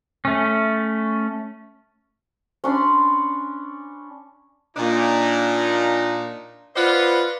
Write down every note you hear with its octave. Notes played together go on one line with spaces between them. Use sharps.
A3 C#4
C#4 D4 B5 C6
A#2 D4 D#4
F4 B4 C5 D5 D#5 F#5